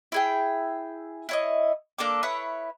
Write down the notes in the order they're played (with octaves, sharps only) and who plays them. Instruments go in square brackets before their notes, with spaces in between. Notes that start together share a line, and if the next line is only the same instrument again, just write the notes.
[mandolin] E4 G#4 G5
E4 C#5 D#5
A#3 D4 A4 D6
E4 B4 C#5 D#6